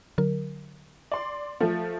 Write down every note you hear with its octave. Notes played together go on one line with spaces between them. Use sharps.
D3 F#3 A#4
D5 C6
F3 A3